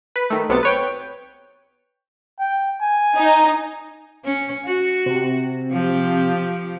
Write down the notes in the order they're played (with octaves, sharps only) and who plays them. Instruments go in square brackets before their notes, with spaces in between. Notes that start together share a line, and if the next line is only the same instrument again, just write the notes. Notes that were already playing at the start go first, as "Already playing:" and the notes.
[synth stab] B4
D#3 A3
B1 C3 B3 A6
B4 C#5 G5
[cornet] G5
G#5
[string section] D#4
[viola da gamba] C#4
F#4
[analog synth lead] C3
[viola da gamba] F3 G4